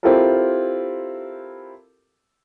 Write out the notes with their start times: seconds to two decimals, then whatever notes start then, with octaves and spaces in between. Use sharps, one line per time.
0.03 C4 E4 F4 G4 A4 A#4